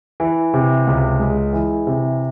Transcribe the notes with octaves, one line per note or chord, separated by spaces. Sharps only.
E3
C3
C#2
G#3
E3
C3